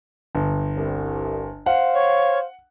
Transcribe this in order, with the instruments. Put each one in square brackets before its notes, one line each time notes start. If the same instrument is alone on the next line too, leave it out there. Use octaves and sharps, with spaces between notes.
[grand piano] G1
[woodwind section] C2
[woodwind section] C5 F5 [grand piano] F#5
[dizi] C#5